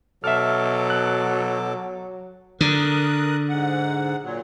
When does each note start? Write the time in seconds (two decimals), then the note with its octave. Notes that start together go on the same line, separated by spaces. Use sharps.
0.24 B2 F#3 A4 E5 D6 F6
0.90 F#6
2.61 D3 A#4 D#6 F#6
3.49 G#2 F#5
4.23 A#2 F#3